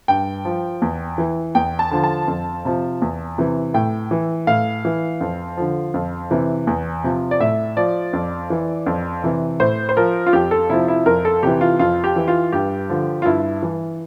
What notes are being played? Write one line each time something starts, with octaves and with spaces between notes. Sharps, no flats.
G2 G5
F3
E2
E3
E2 G5
A5
D3 F3
A5
F2
C3 F3
E2
C3 E3
A2 G5
E3
A2 F5
E3
F2
D3 F3
F2
C3 E3
E2
C3 F3
D5
A2 E5
F3 D5
F2
E3
F2
C3 E3
A2 C5
C5
F3 A#4
F4
F2 G4
A4
C3 F3 E4
E4
F2 A#4
A4
C3 E3 G4
F4
F2 F4
G4
E3
F4
G2 G4
D3 F3
F4
G2 E4
E3